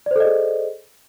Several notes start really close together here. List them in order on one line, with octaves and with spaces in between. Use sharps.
D5 C5 A4 D#5 G#4